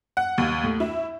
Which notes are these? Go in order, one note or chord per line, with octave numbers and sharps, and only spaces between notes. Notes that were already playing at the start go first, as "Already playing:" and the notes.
F#5
D#2
A2
E4